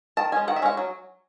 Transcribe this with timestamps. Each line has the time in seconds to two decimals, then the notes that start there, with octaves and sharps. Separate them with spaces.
0.17 D#3 A5
0.32 G#3 C#4 G#5
0.48 D#3 F#5
0.56 E5
0.62 G#3 C#4 F#5
0.77 F#3